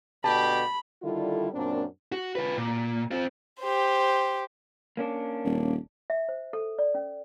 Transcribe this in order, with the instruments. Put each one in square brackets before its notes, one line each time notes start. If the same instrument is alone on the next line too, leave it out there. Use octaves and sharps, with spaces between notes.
[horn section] B2 D3 G4 [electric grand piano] A5 [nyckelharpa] B5
[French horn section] D3 D#3 G3 E4 F4 A4
F#2 A#2 A#3 C4 D4
[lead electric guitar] F#4
F4 B4
A#2
C4 F4
[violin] G4 C5
[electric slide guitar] A#3 C#4 D4
[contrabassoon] D#1
[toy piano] E5
C5
A4
D5
C#4